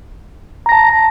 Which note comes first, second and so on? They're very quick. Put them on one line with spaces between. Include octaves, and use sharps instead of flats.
A#5 A#6 A5